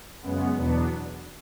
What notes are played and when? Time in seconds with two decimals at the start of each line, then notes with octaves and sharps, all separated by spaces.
0.21 F#2 C#3 G#3 B3
0.56 E2 B2 F#3 B3 D4